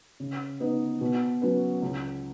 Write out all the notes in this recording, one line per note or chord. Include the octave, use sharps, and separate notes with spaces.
C#3
B3 D#4 B4
B2
F#3 C#4 B4
C#2